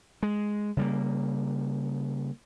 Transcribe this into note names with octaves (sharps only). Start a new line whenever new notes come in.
G#3
C#3 G3 A#3